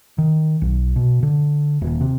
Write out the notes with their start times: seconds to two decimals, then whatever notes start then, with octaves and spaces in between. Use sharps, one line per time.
0.18 D#3
0.62 B1
0.96 B2
1.23 D3
1.82 D#1
2.01 C3